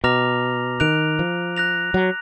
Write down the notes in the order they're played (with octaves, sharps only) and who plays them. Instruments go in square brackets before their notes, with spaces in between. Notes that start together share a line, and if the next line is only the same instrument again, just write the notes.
[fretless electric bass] B2 [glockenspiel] A#5 D6 F6 A#6 F7
[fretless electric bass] D#3 [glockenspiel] F#6 D7 F7
[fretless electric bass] F3
[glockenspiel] F#6 A#6 F7
[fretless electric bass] F#3